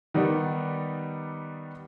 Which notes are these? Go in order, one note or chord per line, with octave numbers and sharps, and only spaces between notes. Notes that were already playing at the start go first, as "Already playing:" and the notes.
D#3 G3 B3 D#4 B4 D5